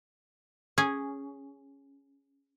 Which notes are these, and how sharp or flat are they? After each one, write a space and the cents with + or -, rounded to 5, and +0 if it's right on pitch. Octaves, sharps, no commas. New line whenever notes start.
C#4 +0 G#4 -5